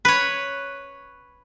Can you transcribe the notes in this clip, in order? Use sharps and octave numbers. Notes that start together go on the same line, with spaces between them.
B4 C#5